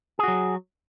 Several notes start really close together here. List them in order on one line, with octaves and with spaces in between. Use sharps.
G#4 F#4 F#3